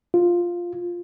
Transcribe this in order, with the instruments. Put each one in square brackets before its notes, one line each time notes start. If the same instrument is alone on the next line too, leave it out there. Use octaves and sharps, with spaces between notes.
[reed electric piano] F4